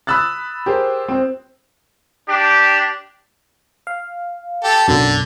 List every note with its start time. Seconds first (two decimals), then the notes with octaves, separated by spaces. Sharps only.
0.07 B5 D#6 E6 F#6 A6
0.66 G4 G#4 A#4 C5
1.08 C4 C5
2.28 D4 G4
3.87 F5
4.64 G4 A4
4.88 B1 F#2 D3